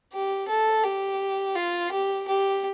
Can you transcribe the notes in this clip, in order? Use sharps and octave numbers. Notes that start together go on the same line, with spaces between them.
G4
A4
G4
F4
G4
G4